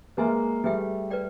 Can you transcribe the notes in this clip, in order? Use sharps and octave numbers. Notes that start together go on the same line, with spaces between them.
G#3 A#3 B4 E5 G#5 C6
G3 A3 G#4 B4 E5 G5
B4 D5 G5